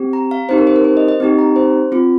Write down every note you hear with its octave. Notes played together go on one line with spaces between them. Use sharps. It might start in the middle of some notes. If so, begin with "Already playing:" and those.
Already playing: C4 G4
A#5
F5
C4 D#4 G4 C5
A#4
C5
A#4
C5
D#5
D#5
C4 D#4 G4 D#5
A#5
C5
C4 F4